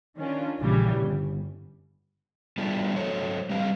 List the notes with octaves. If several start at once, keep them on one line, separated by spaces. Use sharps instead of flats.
D#3 C#4 D4 F4
A#1 C#3 E3 G3
G1
G3 B3 D4 E4 F4 G#4
F#3 A4 C5 C#5
G3 C4 B4 F5